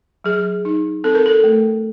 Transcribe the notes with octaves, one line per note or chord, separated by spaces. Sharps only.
F#3 G#4
D#4
C4 A4
A#4
A4
A3